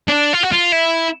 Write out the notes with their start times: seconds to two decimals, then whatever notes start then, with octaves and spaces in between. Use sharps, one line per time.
0.08 D4
0.33 F4
0.43 F#4
0.52 F4
0.72 E4